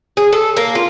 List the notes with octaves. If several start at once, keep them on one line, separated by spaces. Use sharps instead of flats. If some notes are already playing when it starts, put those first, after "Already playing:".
G#4
A4
A#3
F4